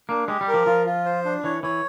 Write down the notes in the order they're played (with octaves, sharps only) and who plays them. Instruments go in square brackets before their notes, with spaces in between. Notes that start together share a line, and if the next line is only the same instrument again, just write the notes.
[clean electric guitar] A#3 [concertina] D4
[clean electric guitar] G#3 [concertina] G4
[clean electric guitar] G3
[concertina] A#4
[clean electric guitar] F3
[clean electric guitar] F3 [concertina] F4
[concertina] F4
C5
D4
[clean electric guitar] E3 [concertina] C#5
[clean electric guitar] E3 [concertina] C#5